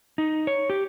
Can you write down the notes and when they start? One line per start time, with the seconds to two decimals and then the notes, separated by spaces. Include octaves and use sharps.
0.18 D#4
0.47 C#5
0.70 G4